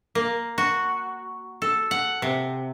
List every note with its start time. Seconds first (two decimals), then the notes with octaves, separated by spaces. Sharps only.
0.15 A#3
0.58 F#4
1.62 A4
1.91 F#5
2.22 C3